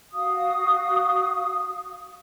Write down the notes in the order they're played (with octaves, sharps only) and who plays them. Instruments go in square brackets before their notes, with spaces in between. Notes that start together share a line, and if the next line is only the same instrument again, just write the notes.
[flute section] F#4 F5 D#6